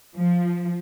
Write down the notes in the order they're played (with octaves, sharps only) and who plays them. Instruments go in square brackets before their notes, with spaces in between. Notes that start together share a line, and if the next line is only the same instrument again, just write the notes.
[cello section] F3